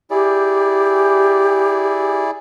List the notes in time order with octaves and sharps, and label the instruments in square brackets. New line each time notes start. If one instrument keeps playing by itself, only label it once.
[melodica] E4 G#4 D5 [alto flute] G4